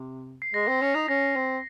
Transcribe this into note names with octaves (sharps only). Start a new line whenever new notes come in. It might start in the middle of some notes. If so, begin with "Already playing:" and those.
Already playing: C3
C7
G#3 A#6
C4
C#4
D#4
C#4 A#6
C4